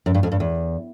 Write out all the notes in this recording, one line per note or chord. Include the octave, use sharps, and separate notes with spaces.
F#2
G2
F2
G2
E2